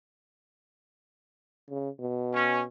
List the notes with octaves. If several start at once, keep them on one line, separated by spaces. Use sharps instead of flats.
C#3
B2
C#4